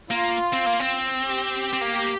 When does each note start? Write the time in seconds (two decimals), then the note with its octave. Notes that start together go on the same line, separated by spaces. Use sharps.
0.11 A#3 F4
0.52 C4
0.66 A#3
0.80 C4
1.24 G4
1.73 C4
1.81 A#3